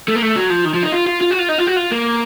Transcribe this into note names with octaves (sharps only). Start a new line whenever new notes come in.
A3
A#3
A3
F#3
F3
D#3
F3
D#4
F4
F4
F4
F#4
F4
D#4
F4
F#4
F4
A#3